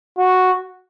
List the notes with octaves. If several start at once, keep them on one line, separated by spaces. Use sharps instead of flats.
F#4